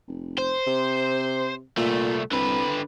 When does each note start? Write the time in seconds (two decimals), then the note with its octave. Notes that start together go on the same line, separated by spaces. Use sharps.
0.08 F1
0.38 C5
0.67 C3
1.77 C2 A#2 A3
2.32 C2 D3 B4